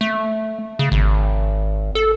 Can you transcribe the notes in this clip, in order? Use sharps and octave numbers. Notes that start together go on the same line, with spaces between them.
A3
C#3
G#1
A4